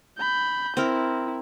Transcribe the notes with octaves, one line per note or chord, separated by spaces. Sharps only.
B5 G6
C4 E4 A#4